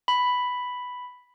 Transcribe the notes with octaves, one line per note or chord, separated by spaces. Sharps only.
B5